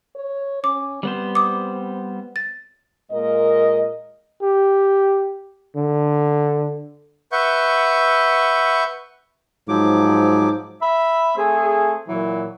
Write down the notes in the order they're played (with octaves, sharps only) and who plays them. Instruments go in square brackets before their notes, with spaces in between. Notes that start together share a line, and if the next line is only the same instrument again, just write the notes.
[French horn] C#5
[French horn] C#4 [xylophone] D6
[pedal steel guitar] G3 B3 C5 [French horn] C4
[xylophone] D6 D#6
A6
[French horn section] A#2 G#3 A#3 A#4 D#5
[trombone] G4
D3
[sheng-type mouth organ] B4 E5 F#5 C#6 G6
[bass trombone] G#2 [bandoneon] F3 F#3 D6
[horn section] E5 B5
A3 C4 G#4
A#2 E3 F#3